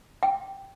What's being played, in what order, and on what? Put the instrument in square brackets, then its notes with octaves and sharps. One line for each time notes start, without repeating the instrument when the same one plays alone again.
[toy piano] G5